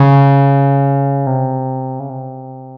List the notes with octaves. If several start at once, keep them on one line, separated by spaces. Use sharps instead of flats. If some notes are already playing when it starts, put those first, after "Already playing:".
Already playing: C#3
C3
C#3
C3